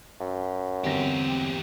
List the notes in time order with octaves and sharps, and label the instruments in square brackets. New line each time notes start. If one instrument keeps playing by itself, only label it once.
[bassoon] F#2
[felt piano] G1 B3 A#6 [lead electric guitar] E2 G4 [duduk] C4